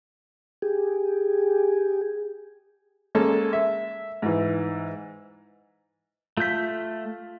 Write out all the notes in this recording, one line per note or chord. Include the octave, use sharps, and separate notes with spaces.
G4 G#4
G#3 A#3 C#4 A4 A5
E5
G#2 E3
A3 F4 G6 B6